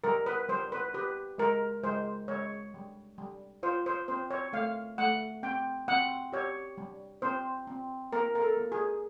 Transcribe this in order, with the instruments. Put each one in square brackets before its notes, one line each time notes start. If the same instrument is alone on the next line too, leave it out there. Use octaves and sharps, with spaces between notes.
[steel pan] G3 A#4
B4
G3 C5
B4
G4 B4
G#3 A#4
G#3 C5
G#3 C#5
G3
G3
F4 C5
C5
C4 C5
C#5
A3 F5
A3 F#5
C4 G5
C4 F#5
G4 C#5
G3
C4 C5
C4
A#3 A#4
A#4
A4
A#3
G#4